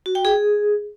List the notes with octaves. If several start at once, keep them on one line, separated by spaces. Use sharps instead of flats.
F#4
G5
G#4